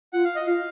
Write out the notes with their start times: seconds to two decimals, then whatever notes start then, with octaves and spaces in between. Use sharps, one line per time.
0.13 F4 F#5
0.25 F5
0.35 D#5
0.47 F4 F5